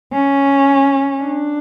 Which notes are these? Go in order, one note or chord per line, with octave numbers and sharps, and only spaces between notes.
C#4
D4